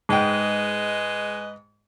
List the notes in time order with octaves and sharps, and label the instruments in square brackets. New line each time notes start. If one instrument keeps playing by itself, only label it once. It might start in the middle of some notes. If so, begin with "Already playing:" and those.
[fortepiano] G#2 G5 [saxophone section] G#3 B4 D#5